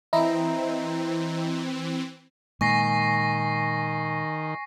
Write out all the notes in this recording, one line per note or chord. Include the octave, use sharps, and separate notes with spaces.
E3 C4 E4 D#5 A#5
A#2 D#3 G#3 A#3 G#5 C#6 A#6 C7